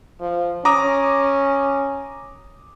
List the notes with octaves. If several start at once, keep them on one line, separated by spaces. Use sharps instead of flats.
F3
C#4 A#5 D6 D#6